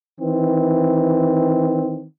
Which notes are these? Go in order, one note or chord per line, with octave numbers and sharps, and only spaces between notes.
D#3 E3 C4